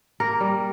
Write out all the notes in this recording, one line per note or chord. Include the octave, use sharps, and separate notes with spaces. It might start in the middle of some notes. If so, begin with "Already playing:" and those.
A#3 A#4
G3